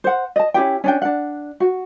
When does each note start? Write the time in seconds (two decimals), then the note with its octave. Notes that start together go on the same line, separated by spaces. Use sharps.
0.04 C5 F#5
0.36 D#5 A5
0.54 C#4 E4 G4 G5
0.84 C#4 D4 G5
1.02 D4 F#5
1.60 F#4